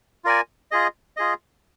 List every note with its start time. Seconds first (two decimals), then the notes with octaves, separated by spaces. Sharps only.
0.25 F4 A#4 D5 G#5
0.71 F4 G#4 D#5
1.17 F4 G#4 D#5